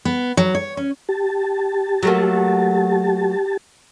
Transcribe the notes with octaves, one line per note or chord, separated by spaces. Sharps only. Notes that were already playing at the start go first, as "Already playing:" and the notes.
B3
F#3
C#5
C#4
G4 A5
F#3 A3 A#3